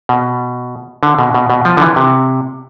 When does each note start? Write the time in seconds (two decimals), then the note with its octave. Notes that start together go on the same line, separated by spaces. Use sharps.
0.09 B2
1.03 D3
1.19 B2
1.34 B2
1.50 B2
1.65 F3
1.77 D3
1.81 E3
1.96 C3